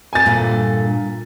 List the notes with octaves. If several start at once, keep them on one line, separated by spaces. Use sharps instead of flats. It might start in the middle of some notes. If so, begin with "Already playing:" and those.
G#5 A6
E2 G2 A#2 D3